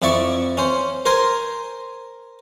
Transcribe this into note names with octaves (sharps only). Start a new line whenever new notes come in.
F2 E4 D5 E5 C#6
C#4 C5
A#4 C5 G#5 C6